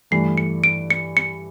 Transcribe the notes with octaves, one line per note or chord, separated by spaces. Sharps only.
G2 E3 A3 C7
C#7
D7
C#7
C#7